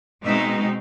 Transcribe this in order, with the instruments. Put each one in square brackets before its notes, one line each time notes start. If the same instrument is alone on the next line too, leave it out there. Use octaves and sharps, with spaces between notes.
[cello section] B2 G#3 C4 D#4 E5